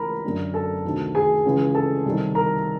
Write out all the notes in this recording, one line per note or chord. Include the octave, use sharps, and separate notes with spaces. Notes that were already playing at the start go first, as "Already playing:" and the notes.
Already playing: C#2 E3 A#4 A#5 B5
F#2 D3
A4 A5
D2 C3 D#3
G#4 G#5
C#2 C#3 E3
A4 A5
C2 C3 D#3
A#4 A#5